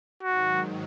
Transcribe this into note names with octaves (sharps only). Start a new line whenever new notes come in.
G#2 D#3 F#3 F#4